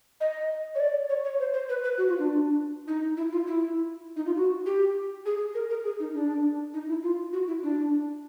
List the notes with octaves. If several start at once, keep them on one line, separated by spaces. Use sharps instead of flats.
D#5
C#5
D5
C#5
C#5
C5
C5
B4
B4
F#4
F4
D4
D#4
E4
F4
E4
D#4
F4
F#4
G4
G#4
A#4
A#4
G#4
D#4
D4
D#4
E4
F4
F#4
E4
D4